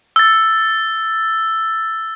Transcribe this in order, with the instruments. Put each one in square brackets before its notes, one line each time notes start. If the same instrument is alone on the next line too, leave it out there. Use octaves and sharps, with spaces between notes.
[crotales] E6 A6